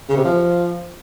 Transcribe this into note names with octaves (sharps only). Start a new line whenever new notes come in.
C#3
C3
F3